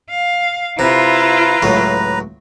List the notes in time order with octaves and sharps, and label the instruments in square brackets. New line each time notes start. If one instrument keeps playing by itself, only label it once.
[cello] F5
[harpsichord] C3 [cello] E4 F4 [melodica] B4 A#5
[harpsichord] C#2 A2 F#3